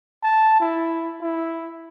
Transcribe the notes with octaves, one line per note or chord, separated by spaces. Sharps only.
A5
E4
E4